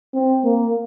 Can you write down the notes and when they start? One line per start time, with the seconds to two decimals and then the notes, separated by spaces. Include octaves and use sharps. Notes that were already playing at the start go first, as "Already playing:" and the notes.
0.14 C4
0.45 A#3